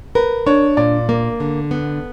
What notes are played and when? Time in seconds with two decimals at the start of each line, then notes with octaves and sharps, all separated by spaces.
0.15 A#4 B4
0.46 D4 C#5
0.77 A#2 D5
1.09 A#3
1.40 D3
1.71 B3